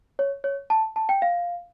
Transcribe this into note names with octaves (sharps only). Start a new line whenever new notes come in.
C#5
C#5
A5
A5
G5
F5